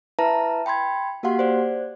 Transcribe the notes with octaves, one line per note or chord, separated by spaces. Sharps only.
E4 B4 E5 A5 A#5 A#6
G5 B5 C6 G#6
A#3 F#4 G4 F5 F#5 C6
C5 D5